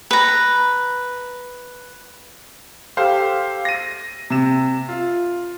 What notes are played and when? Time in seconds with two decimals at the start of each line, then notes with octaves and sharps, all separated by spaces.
0.11 B4 A#5
2.97 G4 A4 C5 F5
3.65 A#6 D#7
4.30 C3 E7
4.89 F4